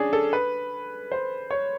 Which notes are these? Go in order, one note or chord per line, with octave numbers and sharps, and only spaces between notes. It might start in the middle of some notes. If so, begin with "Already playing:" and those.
Already playing: C#4 D4 G#4
A4
B4
C5
C#5